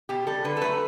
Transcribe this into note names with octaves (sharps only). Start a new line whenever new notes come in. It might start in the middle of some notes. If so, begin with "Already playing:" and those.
B2 G4
G3 A4
D3 B4
A4
F#3 A3 B4